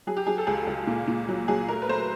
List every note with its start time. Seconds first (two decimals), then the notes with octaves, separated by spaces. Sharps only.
0.07 F#3 G#4
0.17 G4
0.27 F#3 G#4
0.38 A4
0.47 C#2 G#4
0.67 C#2
0.87 A#2
1.08 A#2
1.28 F#3
1.48 F#3 G#4
1.68 A3 A#4
1.82 B4
1.89 A3 C5